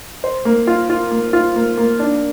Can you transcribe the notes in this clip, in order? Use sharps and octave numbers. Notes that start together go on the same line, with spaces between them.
C5
A#3
F4
F4
A#3
F4
A#3
A#3
D4